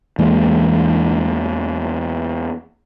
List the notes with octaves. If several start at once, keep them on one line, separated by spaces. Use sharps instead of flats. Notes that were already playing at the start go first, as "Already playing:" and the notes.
E2 E3 G#3 A#3